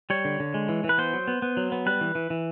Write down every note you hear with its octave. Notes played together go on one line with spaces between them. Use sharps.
G3 C#5
D3
D3
G#3
E3
E3
B4
B3 C5
F#3
B3
B3
F#3
B3
G3 B4
E3
E3
E3